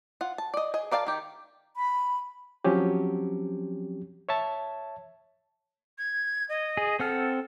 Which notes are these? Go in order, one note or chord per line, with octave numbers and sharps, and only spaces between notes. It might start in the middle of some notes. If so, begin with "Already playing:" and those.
F4 F#5
A5
D5 D#5
G#4 D#5
A#4 D5 F5 G5 A5
D#3 G4
B5
F3 F#3 C4 C#4 G4
C#5 E5 A5
G#6
D#5
G#4
C4 A4 F#5 F6